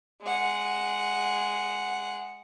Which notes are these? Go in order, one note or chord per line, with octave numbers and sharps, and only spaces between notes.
G#3 F#5